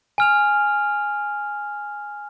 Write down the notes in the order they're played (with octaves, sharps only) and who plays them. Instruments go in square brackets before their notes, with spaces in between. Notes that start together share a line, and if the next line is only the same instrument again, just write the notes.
[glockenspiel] G#5 F6 F7